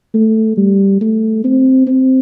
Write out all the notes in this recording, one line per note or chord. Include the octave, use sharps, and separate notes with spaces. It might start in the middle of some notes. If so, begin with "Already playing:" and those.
A3
G3
A3
C4
C4